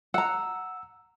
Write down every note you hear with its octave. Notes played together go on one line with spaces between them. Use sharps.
F#5 A#5 E6